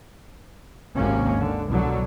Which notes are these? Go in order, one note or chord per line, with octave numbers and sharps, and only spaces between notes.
G#1 D#2 C3 A#3 C#4
D3
C2 B2 D3 F#3